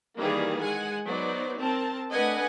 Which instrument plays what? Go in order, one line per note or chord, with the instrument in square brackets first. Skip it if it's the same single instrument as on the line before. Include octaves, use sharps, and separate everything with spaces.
[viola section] D#3 E3 G3 A#3 G#4
G#3 F#5 G#5
F#3 B3 D#4 C5 D5
C4 A#4 A5
A3 D4 B4 D#5 F#5 G#5